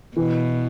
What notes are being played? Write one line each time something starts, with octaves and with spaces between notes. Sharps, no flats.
B2 E3